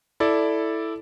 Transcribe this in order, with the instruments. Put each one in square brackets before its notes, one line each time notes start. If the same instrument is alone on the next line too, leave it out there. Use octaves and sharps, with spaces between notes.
[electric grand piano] E4 A4 D5